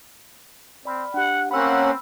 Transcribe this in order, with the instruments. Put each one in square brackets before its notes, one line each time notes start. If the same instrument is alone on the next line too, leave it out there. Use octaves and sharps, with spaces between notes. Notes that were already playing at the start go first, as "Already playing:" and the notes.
[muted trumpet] C4 [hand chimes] D5 B5 F6
[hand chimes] D4 G4 [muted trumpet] F#5
[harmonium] A#3 C#4 F#5 [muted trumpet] C4 [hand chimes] B5 E6